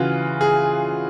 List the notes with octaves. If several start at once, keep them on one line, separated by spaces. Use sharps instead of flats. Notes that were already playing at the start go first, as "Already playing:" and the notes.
Already playing: C#3 E3 F4 F#4
G#4